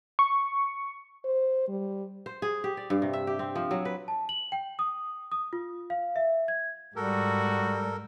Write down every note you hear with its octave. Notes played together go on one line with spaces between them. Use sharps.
C#6
C5
G3
C5
G#4
G4
D5
G2
C3
E5
G4
C4
F3
F#3
B4
A5
F#7
G5
D#6
D#6
F4
F5
E5
G#6
G#2 G3 F#4 A4 A#4